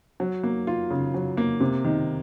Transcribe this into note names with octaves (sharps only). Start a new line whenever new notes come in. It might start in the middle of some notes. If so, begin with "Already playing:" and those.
F#3
A#3
F4
C#3
F#3
A#3
C3
D#3